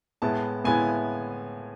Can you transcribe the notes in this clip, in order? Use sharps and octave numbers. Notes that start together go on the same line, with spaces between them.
A2 G#3 B3 E4 A5
A2 G#3 B3 E4 G#5